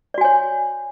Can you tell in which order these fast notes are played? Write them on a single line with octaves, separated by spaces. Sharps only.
D5 F#4 G#5 C#5